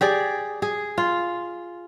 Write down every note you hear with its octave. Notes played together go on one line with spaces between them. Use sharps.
G4 G#4 D5
G#4
F4